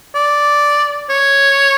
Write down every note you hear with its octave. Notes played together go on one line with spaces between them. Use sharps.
D5
C#5